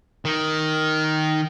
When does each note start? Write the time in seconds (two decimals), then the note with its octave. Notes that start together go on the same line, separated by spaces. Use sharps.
0.25 D#3